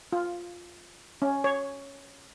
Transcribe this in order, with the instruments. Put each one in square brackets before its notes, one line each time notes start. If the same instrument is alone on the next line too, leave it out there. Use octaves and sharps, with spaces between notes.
[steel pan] F4
C#4
C#5